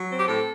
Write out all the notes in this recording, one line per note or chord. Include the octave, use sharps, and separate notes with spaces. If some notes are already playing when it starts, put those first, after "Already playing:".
Already playing: F#3
C4
G4
A2 A4